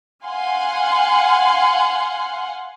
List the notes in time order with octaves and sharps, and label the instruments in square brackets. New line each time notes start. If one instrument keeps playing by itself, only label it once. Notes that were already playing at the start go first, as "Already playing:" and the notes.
[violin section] F5 F#5 G#5 C6